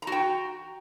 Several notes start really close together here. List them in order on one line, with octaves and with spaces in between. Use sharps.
A#5 F#4 G5